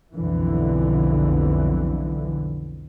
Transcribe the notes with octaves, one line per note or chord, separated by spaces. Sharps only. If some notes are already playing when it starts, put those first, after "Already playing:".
B1 F2 D3 E3